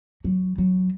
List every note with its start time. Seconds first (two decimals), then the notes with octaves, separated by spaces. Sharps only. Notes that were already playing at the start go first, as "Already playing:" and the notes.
0.24 F#3
0.58 F#3